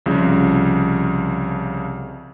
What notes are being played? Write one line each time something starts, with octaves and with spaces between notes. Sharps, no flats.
C2 C#3 F3